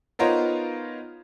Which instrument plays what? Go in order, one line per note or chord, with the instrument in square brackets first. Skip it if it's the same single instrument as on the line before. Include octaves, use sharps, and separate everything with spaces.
[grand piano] B3 D#4 F4 A#4 C5 C#5